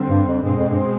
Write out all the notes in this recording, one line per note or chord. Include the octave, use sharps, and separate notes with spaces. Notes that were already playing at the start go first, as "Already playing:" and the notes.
Already playing: D3 G3 C4
G2
F2
G2 B2 G#3 C4
F2
G2